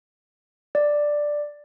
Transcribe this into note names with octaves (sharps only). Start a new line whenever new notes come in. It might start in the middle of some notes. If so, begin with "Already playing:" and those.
D5